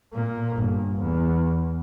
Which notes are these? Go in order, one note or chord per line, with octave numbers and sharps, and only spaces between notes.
A#2 A#3
G1
E2